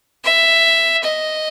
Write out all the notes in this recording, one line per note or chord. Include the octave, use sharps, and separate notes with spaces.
E5
D#5